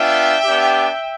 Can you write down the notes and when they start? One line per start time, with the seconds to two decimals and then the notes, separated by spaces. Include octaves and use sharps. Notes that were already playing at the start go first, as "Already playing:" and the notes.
Already playing: B3 D4 F4 E5 G5
0.44 B3 D4 G4